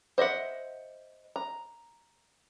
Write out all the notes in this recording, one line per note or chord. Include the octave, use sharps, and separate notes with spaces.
C5 D#5 E5 F#5
A#5